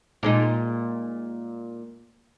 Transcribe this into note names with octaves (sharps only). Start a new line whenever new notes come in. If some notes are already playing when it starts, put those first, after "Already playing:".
A#2 G#3 D#4